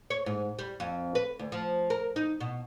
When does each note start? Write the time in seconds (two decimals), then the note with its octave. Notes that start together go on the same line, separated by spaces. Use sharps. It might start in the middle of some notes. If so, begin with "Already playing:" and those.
0.10 C#5
0.26 G#2
0.59 G3
0.80 F2
1.15 B4
1.39 D2
1.52 F3
1.90 A#4
2.16 D#4
2.40 B2